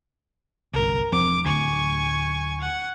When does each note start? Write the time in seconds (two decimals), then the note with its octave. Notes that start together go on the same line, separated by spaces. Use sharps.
0.74 G1 C2 A#4
1.12 E1 F3 C4 D6
1.45 D1 D2 G#5 C#6
2.61 F#5